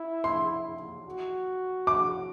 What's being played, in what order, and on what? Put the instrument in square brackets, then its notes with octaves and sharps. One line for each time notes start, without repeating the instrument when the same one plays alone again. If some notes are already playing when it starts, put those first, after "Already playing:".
Already playing: [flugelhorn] E4
[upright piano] C6
[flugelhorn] F#4
[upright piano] D6